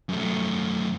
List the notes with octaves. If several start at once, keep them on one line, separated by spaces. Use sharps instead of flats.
F#2 A3